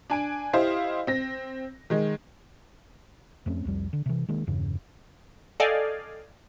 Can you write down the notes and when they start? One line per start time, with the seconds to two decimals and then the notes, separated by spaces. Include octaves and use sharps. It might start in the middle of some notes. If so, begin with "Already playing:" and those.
0.10 D4 G#5 D7
0.53 E4 G4 C5 D#5 F5
1.07 C4 A#6
1.90 D#3 G#3
3.46 F2 A3 C4 C#4
3.65 C2 F2 G3
3.93 D3
4.06 C3 E3
4.28 D#3 G#3 A#3
4.47 E2 G2 C#3 C#4
5.60 A4 D5 D#5 F5 G5 G#5